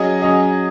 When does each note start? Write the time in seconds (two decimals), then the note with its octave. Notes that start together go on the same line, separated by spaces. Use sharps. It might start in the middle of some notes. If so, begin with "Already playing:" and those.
Already playing: F#3 C#4 G#4 D#5
0.22 F#3 C#4 G#4 D#5